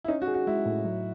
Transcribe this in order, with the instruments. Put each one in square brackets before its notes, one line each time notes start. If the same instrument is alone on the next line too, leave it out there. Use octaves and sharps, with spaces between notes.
[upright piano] E4
[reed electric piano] C#4 [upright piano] D#4
[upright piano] F#4
[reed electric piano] G#4
[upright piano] F#4
[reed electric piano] G#3 [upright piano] E4
[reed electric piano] A2
F#3